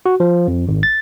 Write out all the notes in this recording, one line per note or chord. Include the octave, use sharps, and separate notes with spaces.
F#4
F3
F2
G#1
A6